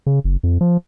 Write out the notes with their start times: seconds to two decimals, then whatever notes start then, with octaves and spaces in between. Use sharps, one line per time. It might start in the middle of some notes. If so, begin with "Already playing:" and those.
0.06 C#3
0.24 F#1
0.43 F2
0.61 F3